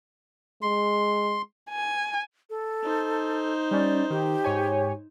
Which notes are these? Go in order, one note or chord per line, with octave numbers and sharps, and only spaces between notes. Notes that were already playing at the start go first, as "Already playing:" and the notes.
G#3 C6
G#5
A4
D#4 C5
G3 C#4 D5
D#3 G4
G#2 C#5 G#5